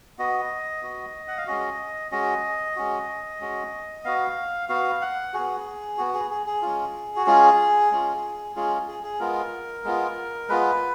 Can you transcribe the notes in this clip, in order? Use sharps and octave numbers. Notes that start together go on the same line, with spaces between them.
B3 F#4 D#5
B3 F#4
F#5
F5
G#3 C#4 F#4 D#5
G#3 C#4 F#4 D#5
G#3 C#4 F#4
G#3 C#4 F#4
B3 F#4 F5
B3 F#4 F5
F#5
B3 F#4 G#4
B3 F#4
G#4
G#4
G#4
G#3 C#4 F4
F#4
G#3 C#4 F4 G#4
G#3 C#4 F4
G#3 C#4 F4 G#4
G#4
G#4
G#3 B3 F4 A#4
G#3 B3 F4
G#3 B3 F4 B4